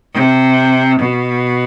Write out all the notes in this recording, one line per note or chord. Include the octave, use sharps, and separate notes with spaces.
C3
B2